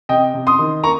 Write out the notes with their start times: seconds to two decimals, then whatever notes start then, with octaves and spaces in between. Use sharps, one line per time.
0.09 C3 D#5 G5
0.34 C3
0.47 C6 D#6
0.59 D#3
0.84 A#3 A#5 C#6